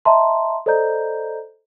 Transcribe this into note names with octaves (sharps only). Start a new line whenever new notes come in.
D#5 E5 A5 A#5 C6
A4 C5 D5 D#5 A#5 G6